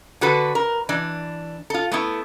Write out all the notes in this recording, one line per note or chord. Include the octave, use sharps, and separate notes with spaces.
D3 F#4 A4 B4
A#4
E3 D4
F4 A4
A3 B3 E4